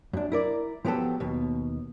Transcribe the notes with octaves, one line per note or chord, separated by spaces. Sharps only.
F#2 D4
E4 A#4 D5
F3 F#3 B3 G4 A4
D#2 B2